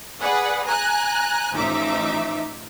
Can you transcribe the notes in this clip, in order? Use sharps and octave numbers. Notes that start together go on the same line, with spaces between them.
G#4 B4 D5 F#5
G#5 A#5 F#6
A1 F3 D#4 E5 D6